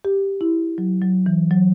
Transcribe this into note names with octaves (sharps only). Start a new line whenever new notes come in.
G4
E4
F#3
F#3
E3
F#3